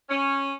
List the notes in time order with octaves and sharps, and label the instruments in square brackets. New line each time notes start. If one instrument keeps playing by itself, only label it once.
[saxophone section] C#4